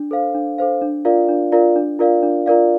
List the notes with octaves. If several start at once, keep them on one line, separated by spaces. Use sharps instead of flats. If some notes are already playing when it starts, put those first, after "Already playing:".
Already playing: D4
A4 C5 F5
D4
A4 C5 F5
D4
F4 A#4 D5 F5
D4
F4 A#4 D5 F5
D4
F4 A#4 D5 F5
D4
F4 A#4 D5 F5